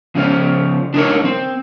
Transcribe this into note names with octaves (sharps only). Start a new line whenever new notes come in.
C#3 F3 C#4
D4 D#4 G#4 A#4 C#5
C4